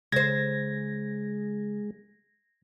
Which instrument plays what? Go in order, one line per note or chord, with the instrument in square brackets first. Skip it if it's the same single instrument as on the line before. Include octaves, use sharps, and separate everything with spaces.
[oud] C#3 C5 [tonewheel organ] G#3 [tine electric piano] G#6 A#6